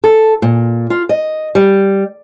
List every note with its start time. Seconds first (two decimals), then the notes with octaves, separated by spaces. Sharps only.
0.04 A4
0.42 A#2
0.90 F4
1.09 D#5
1.55 G3